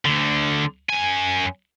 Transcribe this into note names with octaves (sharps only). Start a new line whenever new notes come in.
D2 D3
F#2 G#5